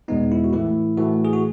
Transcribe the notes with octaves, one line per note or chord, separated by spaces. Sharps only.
E2 B2 G#3 B3 D#4
E4
F#4
A2 E3 A3 E4
A2 E3 A3 F#4
G#4
F#4